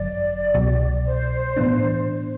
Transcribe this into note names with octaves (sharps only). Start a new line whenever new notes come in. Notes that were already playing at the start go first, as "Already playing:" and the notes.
Already playing: G1 F#2 D3 F#3 D5
C2 B2 F#3
C5
A2 E3 B3 D4